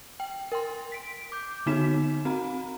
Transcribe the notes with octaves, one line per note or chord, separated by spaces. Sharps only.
G5
A#4 G5 C6
B6 D7
D6 G6
D3 B3 D#4 F#4 B6 E7
C4 F#4 A#5